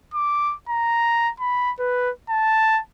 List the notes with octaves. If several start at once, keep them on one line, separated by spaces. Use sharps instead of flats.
D6
A#5
B5
B4
A5